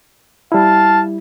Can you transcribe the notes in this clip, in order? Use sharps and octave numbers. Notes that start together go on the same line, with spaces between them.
G3 E4 F5 A5